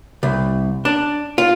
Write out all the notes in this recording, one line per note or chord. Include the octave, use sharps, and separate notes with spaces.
C2
D4
F4